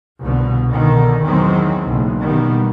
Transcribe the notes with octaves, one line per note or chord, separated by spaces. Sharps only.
C2 B2 D3
B2 D3 D#3
E2 D#3 E3 F#3 G#3 C4
F#1 B1 A2
B2 D#3 E3 G3 B3